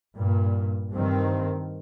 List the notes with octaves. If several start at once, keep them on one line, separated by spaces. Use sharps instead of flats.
G2 A#2
G2 D#3 C4